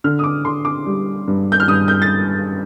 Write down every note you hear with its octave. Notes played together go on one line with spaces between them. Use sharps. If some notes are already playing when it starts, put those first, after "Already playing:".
D3 F6
D#6
D6
D3 C6
D6
G3
G2
G6
F6
G2 D#6
G6
A6